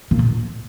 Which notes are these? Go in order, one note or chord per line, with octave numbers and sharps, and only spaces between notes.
A#2